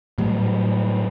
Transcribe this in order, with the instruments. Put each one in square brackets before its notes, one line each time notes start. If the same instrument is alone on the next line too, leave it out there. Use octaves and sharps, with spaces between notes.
[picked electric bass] A2 F#3 G3